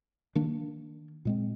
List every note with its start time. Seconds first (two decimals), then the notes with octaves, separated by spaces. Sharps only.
0.35 D#3 A#3 D4
1.25 A#2 G#3 C4